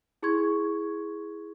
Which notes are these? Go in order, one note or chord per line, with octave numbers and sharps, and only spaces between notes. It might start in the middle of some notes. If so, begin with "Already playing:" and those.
E4 G#4 C6 C#6 G#6